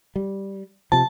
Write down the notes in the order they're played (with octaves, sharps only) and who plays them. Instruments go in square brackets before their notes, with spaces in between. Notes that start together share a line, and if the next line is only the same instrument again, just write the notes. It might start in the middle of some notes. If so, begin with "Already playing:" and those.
[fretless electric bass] G3
[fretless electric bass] C3 F3 [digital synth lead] A5